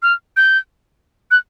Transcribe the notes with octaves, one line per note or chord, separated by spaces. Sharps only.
F6
G6
F#6